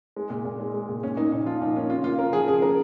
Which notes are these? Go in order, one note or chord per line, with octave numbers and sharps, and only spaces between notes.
G#3
A#2
A#2
G#3
G#3
A#2
A#2 C#4
A#3 D#4
A#2 D#4
F3 F4
A#2 D#4
A#3 C#4
C#3 F4
A#3 F4
C#3 A#4
F3 G#4
C#3 G#4
A#3 A#4